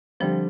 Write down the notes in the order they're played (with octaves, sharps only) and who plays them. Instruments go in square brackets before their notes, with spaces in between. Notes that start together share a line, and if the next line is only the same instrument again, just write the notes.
[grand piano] D3 G3 C4 [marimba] F3